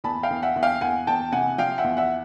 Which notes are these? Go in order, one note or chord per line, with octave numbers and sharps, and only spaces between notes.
E2 A5 B5
F5 G5
E2
E5 F#5
E2
F5 G5
E2 F#5 G#5
E2 G5 A5
C3 F#5 G#5
F3 F5 G5
E5 F#5
E2
E5 F#5